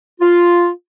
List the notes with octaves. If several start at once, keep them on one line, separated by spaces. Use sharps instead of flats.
F4